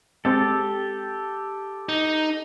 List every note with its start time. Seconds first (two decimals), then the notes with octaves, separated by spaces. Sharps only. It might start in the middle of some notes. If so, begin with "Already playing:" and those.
0.25 G#3 C4 G4 A4
1.89 D#4